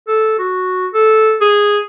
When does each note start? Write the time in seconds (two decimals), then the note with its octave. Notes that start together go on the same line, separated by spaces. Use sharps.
0.08 A4
0.39 F#4
0.94 A4
1.41 G#4